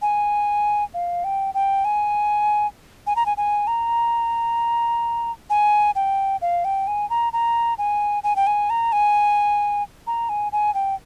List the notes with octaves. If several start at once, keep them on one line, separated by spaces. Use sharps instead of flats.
G#5
F5
G5
G5
G#5
G#5
A#5
G#5
G#5
A#5
G#5
G5
F5
G5
G#5
A#5
A#5
G#5
G#5
G5
G#5
A#5
G#5
A#5
G#5
G#5
G5